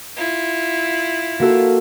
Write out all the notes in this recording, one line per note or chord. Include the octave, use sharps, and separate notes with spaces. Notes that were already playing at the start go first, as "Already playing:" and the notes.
E4 F4
A#3 F#4 A4